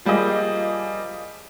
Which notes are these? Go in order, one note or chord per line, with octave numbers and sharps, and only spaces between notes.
F3 G3 A#3 G#4 D#5